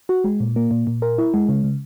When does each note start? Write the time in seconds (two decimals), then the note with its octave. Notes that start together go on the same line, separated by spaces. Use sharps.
0.09 F#4
0.24 G#3
0.40 A#2
0.56 A#3
0.71 A#2
0.87 A#2
1.02 A#4
1.18 E4
1.34 G#3
1.49 C#3
1.64 C#3